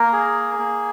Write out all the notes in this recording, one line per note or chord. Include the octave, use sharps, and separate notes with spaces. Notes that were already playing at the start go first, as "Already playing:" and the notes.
Already playing: A#3 A#4
G#4
A#3